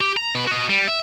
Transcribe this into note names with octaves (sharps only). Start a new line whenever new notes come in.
G4
A#5
B2 B4
F#4 D#5
G3
E5